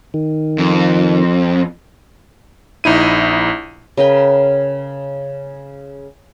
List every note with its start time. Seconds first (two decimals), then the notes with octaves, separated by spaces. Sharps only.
0.14 D#3
0.58 F2
2.84 A#1 D#4 E4 D#7
3.97 C#3 A#4 B4 G5